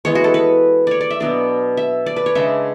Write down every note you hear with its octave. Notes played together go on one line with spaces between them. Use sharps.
E3 G#3 B3 C#5
F#4
A4
B4
C#5 D5
D5
E5
B2 F#3 B3 D4 D5
E5
D5
B4
C#5
C#3 G#3 D4 E5